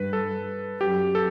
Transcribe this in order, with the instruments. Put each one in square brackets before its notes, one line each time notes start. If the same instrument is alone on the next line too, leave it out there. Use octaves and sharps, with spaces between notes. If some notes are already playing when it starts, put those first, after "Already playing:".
Already playing: [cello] G2 [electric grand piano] B4
[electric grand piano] A4
[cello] F#2 [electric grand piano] G4
[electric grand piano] A4